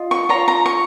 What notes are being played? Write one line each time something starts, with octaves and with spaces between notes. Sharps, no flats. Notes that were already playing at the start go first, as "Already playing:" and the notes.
Already playing: F4 D#5
C#6
F4 C#5 A#5
A#5
C#6